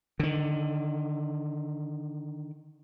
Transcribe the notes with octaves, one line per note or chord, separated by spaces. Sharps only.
D3 D#3